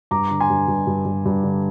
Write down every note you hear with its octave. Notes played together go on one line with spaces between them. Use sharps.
G2 A#5 D6
D3
G#5 C6
G2
G2
G2
G2
G2
D3